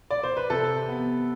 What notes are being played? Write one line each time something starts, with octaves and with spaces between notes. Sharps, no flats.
D5
C5
B4
C3 A4
B3